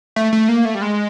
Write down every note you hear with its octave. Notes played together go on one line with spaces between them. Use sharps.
A3
A3
A#3
A3
G3
G#3